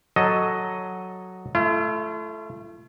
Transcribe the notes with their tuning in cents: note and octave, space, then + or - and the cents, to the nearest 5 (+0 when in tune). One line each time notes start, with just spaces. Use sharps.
F#3 +0 A4 +0 D#5 +0
A3 -10 F4 -45